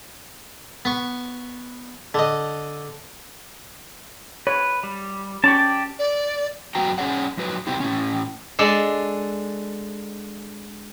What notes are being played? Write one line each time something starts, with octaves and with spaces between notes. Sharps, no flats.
B3 C#6
D3 D#5
B4 C#5
G3
C#4 G4 D5 A5 C#6
D5
F#2 B3 F#4 G5 A#5
C#4 D4 G#4 C#5 D5 F#5
F2 F#3 B4
C3 G3 B3 C4 E4 G4
A2 C#4
G#3 D4 A4